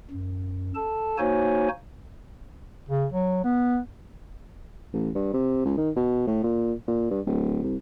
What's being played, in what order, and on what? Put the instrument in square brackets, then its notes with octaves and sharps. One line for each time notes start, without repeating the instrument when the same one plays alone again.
[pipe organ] F#2
A4 A5
A#3 D#4 F#4 C5 C#5 G#5
[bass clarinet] C#3
F#3
B3
[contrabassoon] A1
G2
C3
C#2
D#3
B2
A2
A#2
A#2
G2
D1
C2